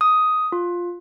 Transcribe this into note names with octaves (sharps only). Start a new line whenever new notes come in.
D#6
F4